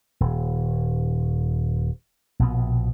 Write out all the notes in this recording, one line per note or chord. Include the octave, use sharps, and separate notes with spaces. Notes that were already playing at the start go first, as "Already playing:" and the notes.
D#1
A#1 B2 B3